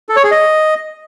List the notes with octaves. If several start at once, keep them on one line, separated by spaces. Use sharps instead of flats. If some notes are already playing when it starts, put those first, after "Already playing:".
A4
C#5
G#4
D#5